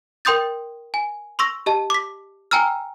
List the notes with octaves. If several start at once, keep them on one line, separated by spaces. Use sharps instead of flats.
A#4 G5 C6 D#6 G6 A6
G#5
C6 C#6 E6 A#6
G4 D#5 A5
D6 B6
G5 G#5 A#5 E6 F6